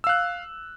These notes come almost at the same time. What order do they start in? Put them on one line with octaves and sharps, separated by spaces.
E6 F5 F#6